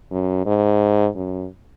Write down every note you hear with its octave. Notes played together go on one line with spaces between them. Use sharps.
F#2
G#2
F#2